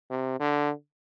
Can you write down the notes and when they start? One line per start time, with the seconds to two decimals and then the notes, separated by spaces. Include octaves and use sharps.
0.10 C3
0.40 D3